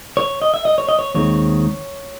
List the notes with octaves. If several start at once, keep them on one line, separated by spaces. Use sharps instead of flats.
C#5
D#5
E5
D#5
C#5
D#5
C#5
D#2 D#3 G#3 C4 C#5